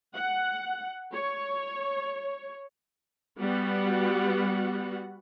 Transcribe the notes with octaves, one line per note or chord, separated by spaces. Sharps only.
F#5
C#5
G3 B3 F#4 F#5